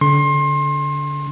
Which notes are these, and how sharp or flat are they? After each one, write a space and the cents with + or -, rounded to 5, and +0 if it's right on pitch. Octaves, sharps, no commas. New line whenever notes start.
D3 -30 C6 +30